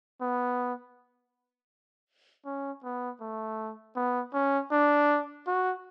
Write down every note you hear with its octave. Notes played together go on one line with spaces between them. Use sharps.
B3
C#4
B3
A3
B3
C#4
D4
F#4